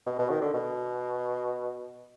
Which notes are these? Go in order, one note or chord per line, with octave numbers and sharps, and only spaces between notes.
B2
B2
D#3
D3
B2